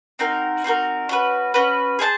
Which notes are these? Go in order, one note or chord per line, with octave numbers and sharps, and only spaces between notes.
C4 D#4 F#4 A#4
C4 D#4 F#4 A#4
C#4 F#4 B4
C#4 F#4 B4
G#4 C5 F5 A5